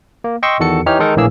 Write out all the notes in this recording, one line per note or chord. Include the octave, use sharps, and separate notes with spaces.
A#3
D#5 G5 C6 C#6 E6
E2 D#3 F#4 A4 C#7
E3 D#4 G4 C#5 F6
D#3 G#3 D#4 A4 A#4
A#1 A2 E3 A#3 G#4 E6